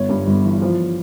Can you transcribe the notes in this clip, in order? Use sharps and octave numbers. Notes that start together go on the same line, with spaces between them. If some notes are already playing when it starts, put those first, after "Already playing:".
Already playing: G1 C#5
G2
G1
E3
F3